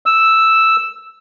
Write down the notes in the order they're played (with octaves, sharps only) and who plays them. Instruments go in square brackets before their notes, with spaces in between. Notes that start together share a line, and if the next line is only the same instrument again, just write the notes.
[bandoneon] E6